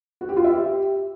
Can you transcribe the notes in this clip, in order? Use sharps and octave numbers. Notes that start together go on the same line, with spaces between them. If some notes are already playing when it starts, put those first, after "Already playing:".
F#4
G4
F4
E5
G4